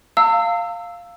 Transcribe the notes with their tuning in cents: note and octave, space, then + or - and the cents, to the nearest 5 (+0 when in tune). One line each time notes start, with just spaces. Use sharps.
F5 +0 A#5 -45 E6 +0